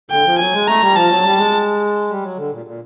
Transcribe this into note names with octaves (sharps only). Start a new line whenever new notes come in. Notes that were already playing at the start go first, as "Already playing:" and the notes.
D3 G5
F3
F#3 G#5
G#3
A3 A#5
G3
F3 A5
F#3
G3
G#3
G3
F#3
D3
A#2
A#2